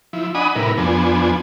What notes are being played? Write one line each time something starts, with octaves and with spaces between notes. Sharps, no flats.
F3 E4
D4 D#5 F#5 G#5 B5 D#6
A2 C3 G3 E4 A#4 B4
F2 F3 B3 D4 G#5